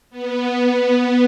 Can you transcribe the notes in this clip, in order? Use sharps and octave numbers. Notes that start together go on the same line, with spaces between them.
B3